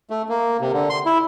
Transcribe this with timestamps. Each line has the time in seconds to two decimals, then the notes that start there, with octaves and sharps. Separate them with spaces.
0.10 A3
0.29 A#3
0.61 C3
0.72 D3
0.90 C6
1.06 E4